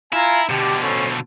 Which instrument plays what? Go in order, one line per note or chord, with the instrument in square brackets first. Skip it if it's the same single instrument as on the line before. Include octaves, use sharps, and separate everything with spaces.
[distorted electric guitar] E4 [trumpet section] F4 G#5 A#5
[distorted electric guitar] B2 D3 [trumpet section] G4
[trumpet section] C#4 A4 C5